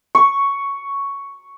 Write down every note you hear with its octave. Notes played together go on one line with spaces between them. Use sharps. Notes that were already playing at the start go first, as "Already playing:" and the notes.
C#6